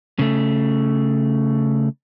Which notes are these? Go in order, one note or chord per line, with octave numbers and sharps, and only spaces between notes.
C#3 A3